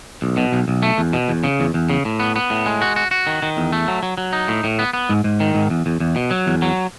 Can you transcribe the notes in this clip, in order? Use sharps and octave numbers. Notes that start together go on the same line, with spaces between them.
B1
B2
B1
B1
A3
E2
B2
E2
C#3
E2
E2
C#3
A2
B3
B3
A2
G#3
F#4
F#4
F#4
D#3
D#3
E2
A3
F#3
F#3
F#3
D#4
A2
A2
B3
B3
G#2
G#2
D#3
G#2
E2
E2
E2
B2
F#3
E2
F#3